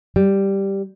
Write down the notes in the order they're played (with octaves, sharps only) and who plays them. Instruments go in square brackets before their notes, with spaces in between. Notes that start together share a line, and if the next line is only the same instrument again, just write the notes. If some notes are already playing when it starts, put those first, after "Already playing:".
[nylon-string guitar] G3